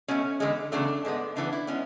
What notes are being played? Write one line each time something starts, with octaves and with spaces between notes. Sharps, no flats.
B2 A3 C#4
E2 D3 G#3
E2 C#3 F#3 A3 D4
G#2 G#3 B3
C#3 E3 B3 D4
E4
G#3 B3 C#4